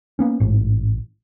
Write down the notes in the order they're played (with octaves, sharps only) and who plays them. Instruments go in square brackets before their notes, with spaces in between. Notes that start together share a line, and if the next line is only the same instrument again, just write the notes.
[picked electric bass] A#3 B3 C#4
A1 G#2